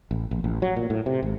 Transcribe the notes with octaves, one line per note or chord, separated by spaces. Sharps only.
A1
A#1
A1
F#3
A#2
A2
C3
G#1